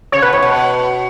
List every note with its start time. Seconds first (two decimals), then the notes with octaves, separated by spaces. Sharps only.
0.12 C#3 C#5
0.22 B2 B4
0.33 A2 C#5
0.43 B2